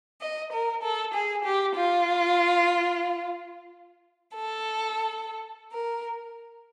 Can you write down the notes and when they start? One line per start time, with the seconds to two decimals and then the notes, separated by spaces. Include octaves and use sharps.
0.21 D#5
0.52 A#4
0.83 A4
1.13 G#4
1.44 G4
1.74 F4
4.35 A4
5.71 A#4